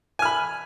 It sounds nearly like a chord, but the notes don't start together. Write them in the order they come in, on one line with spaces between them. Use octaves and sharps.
G#5 F6 B5